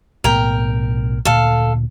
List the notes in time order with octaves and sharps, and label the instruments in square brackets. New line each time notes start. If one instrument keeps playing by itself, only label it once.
[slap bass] B1 A2 B3 [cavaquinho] A#4 G5
[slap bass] D2 A#2 [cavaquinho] A4 F5